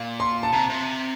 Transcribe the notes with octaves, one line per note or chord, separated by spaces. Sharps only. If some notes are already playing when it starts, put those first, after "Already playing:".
Already playing: A#2
C6
A5
C3 A#5
C3